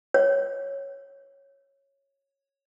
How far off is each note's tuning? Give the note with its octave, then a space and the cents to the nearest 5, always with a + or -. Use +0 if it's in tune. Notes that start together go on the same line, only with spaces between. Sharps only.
C#5 -10